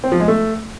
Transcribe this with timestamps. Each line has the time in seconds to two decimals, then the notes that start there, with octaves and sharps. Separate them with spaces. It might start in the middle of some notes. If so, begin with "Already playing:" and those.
0.04 C4
0.12 F3
0.20 G#3
0.28 A3